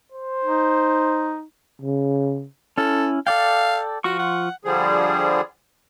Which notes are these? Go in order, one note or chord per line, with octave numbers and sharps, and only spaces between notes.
C5
D#4
C#3
C#4 E4 A4
A4 D5 F5 G5
F3 F4 F#4 C#6
F#5
D3 F3 G3 G#4